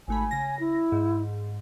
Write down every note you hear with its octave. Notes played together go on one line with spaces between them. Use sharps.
G#1 A3 G#5 B5
C#3 A#6
E4
G#2